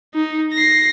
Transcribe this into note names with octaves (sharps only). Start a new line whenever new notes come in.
D#4
A#6 C7